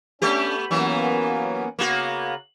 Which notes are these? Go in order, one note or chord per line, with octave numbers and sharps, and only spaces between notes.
A3 B3 C#4 D4 G4
E3 F#3 A#3 B3 C#4
C#3 A#3 B3 F#4